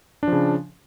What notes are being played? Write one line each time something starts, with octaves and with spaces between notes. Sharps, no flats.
C#3 F3 D4